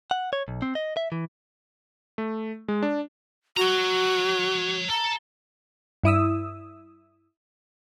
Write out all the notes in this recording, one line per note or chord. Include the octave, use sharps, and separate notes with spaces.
F#5
C#5
B1
C4
D#5
E5
E3
A3
G#3
D4
F#4 C#5 A#5
A4 A#5
G2 E4 D#6 E6